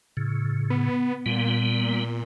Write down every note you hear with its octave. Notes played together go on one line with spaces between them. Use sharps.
A2 C#3
B3
A#2 G3 B3